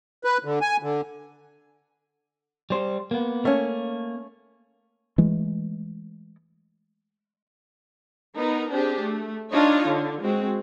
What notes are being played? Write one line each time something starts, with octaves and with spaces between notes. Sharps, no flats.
B4
D3
G#5
D3
G3 C5
A#3 B3
A3 A#3 C#4
E3 G#3 A3
B3 D#4 A#4
C4 D4 G4 G#4
A3
D4 D#4 F4 C#5 D#5
D3
G#3 C4 F#4